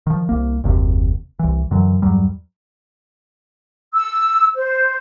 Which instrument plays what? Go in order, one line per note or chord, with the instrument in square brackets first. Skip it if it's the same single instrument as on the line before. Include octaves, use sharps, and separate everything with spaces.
[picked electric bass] D#3 F3
C2 A#3
F#1 D#2 C3
C2 E3
F#2 D3 E3 F#3
E2 G2 F#3 G3
[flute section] E6
C5